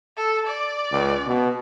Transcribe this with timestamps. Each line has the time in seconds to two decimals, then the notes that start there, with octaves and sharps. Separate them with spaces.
0.17 A4
0.47 D5
0.92 C#2
1.27 B2